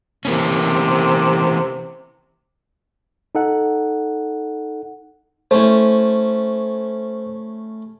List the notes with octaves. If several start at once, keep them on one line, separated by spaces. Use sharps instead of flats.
C3 E3 A#3 C#4
D#4 A4 F#5
A3 C#4 E4 C5